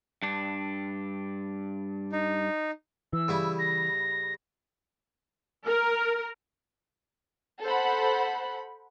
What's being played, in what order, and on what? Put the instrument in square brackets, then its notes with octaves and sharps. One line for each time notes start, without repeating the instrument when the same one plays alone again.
[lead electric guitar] G2 D4
[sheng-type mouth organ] D#4
[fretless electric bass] E3 [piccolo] E6
[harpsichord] C#3 G3 E4
[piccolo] A#6
[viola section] A#4
[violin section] A4 C5 F#5 B5